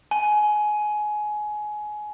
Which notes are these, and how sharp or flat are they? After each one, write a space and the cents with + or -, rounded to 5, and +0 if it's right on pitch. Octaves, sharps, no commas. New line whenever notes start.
G#5 +20